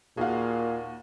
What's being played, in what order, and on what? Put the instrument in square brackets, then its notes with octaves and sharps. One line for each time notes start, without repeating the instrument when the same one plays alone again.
[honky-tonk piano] D#2 F#4 [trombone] A#2 [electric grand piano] G#4 F5